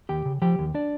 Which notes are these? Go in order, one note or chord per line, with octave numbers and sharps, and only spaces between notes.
D#2 G4 G5
C#3
F3 G4 G5
D#2
D4 D5